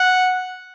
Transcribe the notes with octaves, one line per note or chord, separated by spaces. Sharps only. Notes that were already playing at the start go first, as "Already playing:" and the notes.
Already playing: F#5